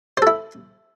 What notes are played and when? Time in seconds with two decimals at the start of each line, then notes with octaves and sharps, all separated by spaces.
0.17 C5
0.22 A4
0.27 E4